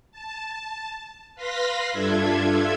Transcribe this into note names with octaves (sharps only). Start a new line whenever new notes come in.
A5
B4 F5 B5 C6 A#6 B6
G2 D4 F4 A4 E5 G#6